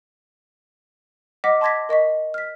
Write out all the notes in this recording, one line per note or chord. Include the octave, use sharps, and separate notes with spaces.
D#5 F#5 D6 F6 A#6 B6
A5 C6 D6 G#6 A#6 B6
A#4 D#5 C#6 B6
F6 B6